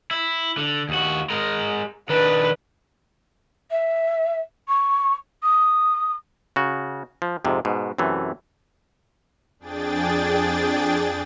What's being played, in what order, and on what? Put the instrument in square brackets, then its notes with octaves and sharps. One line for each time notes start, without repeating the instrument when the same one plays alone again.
[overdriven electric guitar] E4
D3
D#2 F#4
G#3 A#4
[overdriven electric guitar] D#3 D4 [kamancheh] B4
[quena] E5
C#6
D#6
[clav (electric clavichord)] C#3 F#4
F3
F2 G#2 C3
G#2 B2
F#2 C3 E3 A3
[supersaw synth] F2 D4 G#4 G5 A6